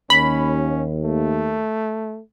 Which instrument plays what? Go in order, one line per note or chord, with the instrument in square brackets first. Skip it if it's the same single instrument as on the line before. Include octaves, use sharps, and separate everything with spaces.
[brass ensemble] D#2 [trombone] C#4 [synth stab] B5
[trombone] A3